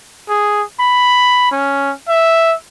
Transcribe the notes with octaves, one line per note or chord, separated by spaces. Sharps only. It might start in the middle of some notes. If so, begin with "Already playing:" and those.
G#4
B5
C#4
E5